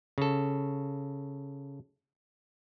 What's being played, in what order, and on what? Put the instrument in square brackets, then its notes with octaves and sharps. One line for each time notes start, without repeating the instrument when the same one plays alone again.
[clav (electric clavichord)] C#3 A4